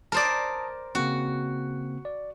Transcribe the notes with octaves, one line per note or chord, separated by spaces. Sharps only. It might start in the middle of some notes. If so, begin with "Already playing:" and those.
A#4 C5 D5 A5 A#5 D#6
C#3 A#3 C4 F#4
D5